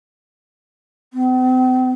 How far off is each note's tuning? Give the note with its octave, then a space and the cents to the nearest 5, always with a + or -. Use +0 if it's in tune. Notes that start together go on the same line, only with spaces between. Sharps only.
C4 -45